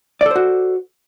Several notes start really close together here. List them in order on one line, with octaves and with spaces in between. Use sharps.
D5 A4 C5 F#4